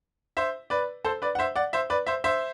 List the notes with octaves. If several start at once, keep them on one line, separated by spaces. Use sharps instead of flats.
C5 E5
B4 D5
A4 C5
B4 D5
F#5
C5 E5
D5 F#5
C5 E5
B4 D5
C5 E5
C5 E5